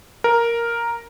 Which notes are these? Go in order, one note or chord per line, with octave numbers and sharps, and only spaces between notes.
A#4